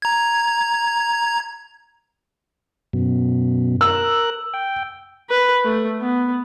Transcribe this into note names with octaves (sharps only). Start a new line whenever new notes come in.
A#5 G#6
F#2 B2
A#4 E6 F#6
G5
B4
A3
B3